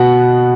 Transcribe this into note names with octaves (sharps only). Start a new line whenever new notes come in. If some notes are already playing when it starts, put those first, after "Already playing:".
Already playing: B2 F#5